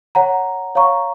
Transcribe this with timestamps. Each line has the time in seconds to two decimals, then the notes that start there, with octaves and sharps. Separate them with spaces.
0.15 C#5 F#5 A#5
0.75 C#5 F5 A#5 C#6